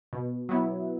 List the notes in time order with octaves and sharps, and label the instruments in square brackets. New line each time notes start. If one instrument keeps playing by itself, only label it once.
[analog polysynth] B2
F#3 B3 E4